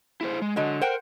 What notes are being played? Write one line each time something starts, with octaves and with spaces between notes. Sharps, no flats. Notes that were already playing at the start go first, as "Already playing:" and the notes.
E4 G#4 C5
G#3
D3 F#3 G#3
A#4 C5 F#5 G5